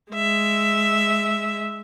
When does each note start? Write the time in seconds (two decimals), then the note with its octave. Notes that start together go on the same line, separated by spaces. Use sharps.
0.12 G#3 E5